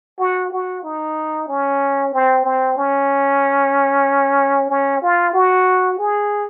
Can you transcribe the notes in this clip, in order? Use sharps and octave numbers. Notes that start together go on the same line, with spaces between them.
F#4
F#4
D#4
C#4
C4
C4
C#4
C#4
F4
F#4
G#4